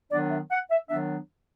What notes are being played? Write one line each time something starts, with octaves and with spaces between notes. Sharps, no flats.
D#3 F#3 B3 D4 D5
E5
F#5
E5
D#3 F#3 B3 D4 E5